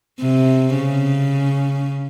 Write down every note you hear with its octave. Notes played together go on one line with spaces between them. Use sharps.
C3
C#3